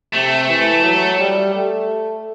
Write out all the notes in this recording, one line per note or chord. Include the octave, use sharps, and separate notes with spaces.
C3 A3
E3
F#3
G3
A3